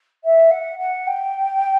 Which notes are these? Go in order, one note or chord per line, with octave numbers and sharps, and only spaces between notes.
E5
F#5
F#5
G5